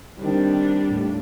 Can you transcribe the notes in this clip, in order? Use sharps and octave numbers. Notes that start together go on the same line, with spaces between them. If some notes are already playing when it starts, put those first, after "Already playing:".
D#3 G3 C4 D4
D#2 A2